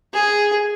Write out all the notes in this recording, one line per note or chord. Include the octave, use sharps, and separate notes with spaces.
G#4